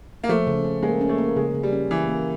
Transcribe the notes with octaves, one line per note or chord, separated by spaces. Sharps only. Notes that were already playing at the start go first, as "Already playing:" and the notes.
A#3
F3 A3
C#3
C#4
G#3 A#3
C#4
A3
A#3
C#3 G#3
C#3
G3
C#4
E3 A#3
A#3